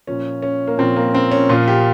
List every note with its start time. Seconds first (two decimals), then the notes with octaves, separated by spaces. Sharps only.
0.07 A#2 F3 C#4
0.42 C#4
0.67 A#3
0.78 A#2 F3 C4
0.96 A#3
1.14 C4
1.31 C#4
1.49 A#2 F3 F4
1.68 G4